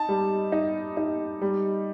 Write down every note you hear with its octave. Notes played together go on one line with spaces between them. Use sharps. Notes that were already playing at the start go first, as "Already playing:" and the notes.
Already playing: D#4 A5
G3
D#4
D#4
G3